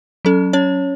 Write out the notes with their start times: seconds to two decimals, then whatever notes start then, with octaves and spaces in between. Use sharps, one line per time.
0.25 F#3 C#4 A4
0.53 C#4 C#5